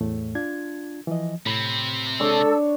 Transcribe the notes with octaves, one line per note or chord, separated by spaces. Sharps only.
E2 A2 A3
D4 F4 G#6
E3 F3 D#5
A2 C3 C4 B5
G#3 D4 A4 C#5 E6